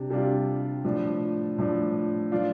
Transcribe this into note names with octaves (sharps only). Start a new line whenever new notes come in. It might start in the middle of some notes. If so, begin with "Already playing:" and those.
Already playing: C3 G3 D4
C3 G3 D4 F4
A2 F3 D4
A2 F3 D4
F3 D4 F4